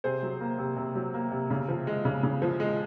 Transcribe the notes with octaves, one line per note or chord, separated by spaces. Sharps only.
C3 G#4 C5
F#3
A#3
C3
C3
F#3
A#3
C3
C#3
F3
G#3
C#3
C#3
F3
G#3